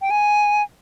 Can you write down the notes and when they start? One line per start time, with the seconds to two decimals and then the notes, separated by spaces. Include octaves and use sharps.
0.02 G5
0.11 G#5